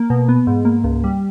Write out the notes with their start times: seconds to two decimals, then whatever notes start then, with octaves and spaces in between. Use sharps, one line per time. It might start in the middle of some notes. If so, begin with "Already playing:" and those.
Already playing: A#3
0.10 B2
0.29 B3
0.47 G#2
0.65 A#3
0.84 C#2
1.04 G3